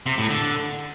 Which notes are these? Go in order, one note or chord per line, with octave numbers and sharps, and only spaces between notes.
C3
A2
D3